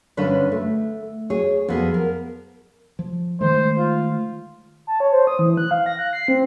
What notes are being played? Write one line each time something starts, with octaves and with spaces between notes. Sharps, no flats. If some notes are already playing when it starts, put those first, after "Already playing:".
G2 D3 C#4 D4 B4 C#5
A3
G#4 C#5
F2 B3 G#4
A#4
F3
D#3 G#3 A3 C5
F4
A5
C#5
C5
D#6
E3
F#6
F5
A#6
F#6
C7
C4